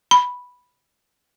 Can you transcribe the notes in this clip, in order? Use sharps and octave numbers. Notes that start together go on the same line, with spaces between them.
B5